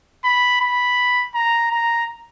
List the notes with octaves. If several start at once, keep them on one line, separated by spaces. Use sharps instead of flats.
B5
B5
A#5
A#5